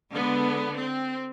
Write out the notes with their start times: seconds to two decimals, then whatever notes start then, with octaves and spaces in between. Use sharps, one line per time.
0.12 D3 G#3 B3
0.75 C4